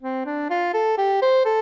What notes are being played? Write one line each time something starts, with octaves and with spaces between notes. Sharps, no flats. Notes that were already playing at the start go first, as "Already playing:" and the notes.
C4
D4
F4
A4
G4
C5
A4